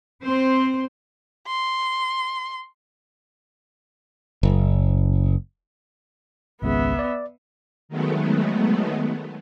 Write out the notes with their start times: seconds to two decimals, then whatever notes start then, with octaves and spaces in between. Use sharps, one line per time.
0.23 C4 C5
1.47 C6
4.43 F#1
6.62 G#1 C#2 C#3 B3 E5
6.99 D5
7.89 D#3 F#3 G#3 A3 B3